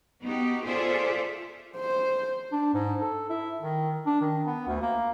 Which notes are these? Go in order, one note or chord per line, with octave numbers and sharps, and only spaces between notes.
B3 D#4 F#4 G4
F4 G#4 A4 C5 D5 E5
C5
D4
G#2
A4
E4
D#3
D4
D#3
B3
D2
A#3